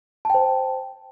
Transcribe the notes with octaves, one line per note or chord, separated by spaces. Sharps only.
C5 G5 A5